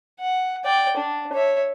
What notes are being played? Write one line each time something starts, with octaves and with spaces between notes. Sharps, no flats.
F#5
D5 G5
D4
C#5 E5